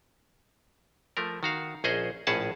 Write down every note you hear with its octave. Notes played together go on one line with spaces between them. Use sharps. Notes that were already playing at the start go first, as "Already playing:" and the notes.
F3 A3 A#4
D#3 F#4 F5
A#1 C#4 G#4 C5 D#5
A#1 A2 C#4 G#4 F#5 A5